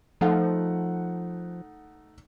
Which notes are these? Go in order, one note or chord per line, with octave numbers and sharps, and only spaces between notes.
F3 A3 D#4 F#5